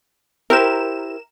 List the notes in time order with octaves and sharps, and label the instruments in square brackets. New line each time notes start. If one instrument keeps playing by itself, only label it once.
[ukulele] E4 G4 C5 [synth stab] A#4 E7